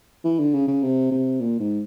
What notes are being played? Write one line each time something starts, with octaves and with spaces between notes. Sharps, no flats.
E3
D3
C#3
C#3
C3
C3
A#2
G#2